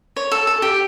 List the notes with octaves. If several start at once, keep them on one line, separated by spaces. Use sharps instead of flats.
C#5
A4
A4
G4